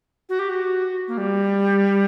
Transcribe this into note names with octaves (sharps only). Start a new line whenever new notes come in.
F#4
G4
F#4
A#3
G3